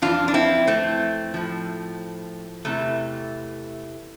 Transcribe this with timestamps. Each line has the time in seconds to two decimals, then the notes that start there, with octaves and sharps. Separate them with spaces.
0.02 F2 E3 D4 F4
0.28 D4
0.34 C4 E4
0.67 A3 C4
1.34 A2 F3
2.65 E2 C3 E3 A3